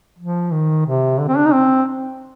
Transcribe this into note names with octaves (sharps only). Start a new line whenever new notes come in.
F3
D#3
C3
D3
C4
D4
D#4
C4